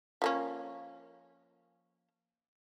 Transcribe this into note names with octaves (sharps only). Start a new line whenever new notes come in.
F3 A#3 C#4